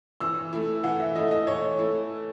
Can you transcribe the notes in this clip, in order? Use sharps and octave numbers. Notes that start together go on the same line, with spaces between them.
E3 E6
A3 E4
E3 F#5
E5
A3 E4 D#5
D#5
E3 C#5
A3 E4